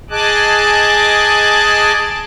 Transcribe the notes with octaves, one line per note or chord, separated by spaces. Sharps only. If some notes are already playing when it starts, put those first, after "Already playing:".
G#4 D#5 G#5 A5 D6 F#6